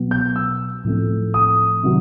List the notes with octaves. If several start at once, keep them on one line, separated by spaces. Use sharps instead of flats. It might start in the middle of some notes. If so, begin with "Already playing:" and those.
Already playing: B2 F#3 B3
G6
E6
A2 F3 A3 C4
D#6
C3 D#3 F#3